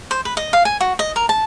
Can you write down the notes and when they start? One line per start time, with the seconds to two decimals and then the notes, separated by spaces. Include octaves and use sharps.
0.11 C5
0.25 B4
0.37 D#5
0.53 F5
0.65 G#5
0.81 F#4
0.99 D#5
1.16 A#4
1.29 A5